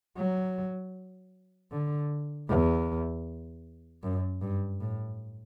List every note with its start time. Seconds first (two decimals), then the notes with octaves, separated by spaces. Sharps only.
0.17 F#3
1.71 D3
2.49 E2
4.03 F#2
4.41 G2
4.80 A2